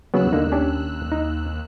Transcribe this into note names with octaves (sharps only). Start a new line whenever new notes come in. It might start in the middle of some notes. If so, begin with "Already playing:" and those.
D#2 C#3 F#3 B3 E6 F#6
D3 A#3 D#4
C#4 D4 G4
D#4